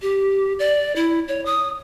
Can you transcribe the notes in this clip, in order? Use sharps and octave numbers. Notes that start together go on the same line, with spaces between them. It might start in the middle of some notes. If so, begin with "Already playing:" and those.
G4
D5
E4
C#5
D#6